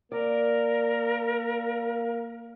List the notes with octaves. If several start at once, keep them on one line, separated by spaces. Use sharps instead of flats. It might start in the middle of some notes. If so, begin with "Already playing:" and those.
A#3 A#4 D5